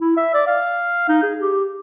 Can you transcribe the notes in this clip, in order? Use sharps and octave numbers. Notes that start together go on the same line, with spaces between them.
E4
E5
D5
F5
D#4
G#4
G4